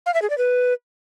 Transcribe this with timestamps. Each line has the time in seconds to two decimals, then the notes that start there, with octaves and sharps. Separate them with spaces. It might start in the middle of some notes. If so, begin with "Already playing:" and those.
0.06 F5
0.14 E5
0.22 G#4
0.30 D5
0.38 B4